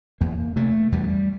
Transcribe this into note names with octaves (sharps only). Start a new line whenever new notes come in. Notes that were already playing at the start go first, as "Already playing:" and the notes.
E2 A#3
C3 A3
E2 G3